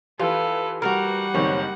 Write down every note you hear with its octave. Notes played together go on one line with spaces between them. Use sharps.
E3 F4 G4 A4 B4
G3 F#4 A4 A#4 F#5
F#1 D#3 C4 C#5